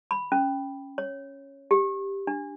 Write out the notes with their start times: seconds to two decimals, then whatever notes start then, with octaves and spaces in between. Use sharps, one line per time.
0.11 B5
0.32 C#4
0.98 C#5
1.71 G4
2.27 D4